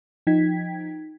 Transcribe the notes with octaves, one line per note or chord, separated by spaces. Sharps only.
F3 D#4 G5 G#6 B6